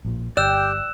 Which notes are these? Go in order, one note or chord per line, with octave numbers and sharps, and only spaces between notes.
A#1 A#2
G1 G4 D5 G5 E6 F#6 E7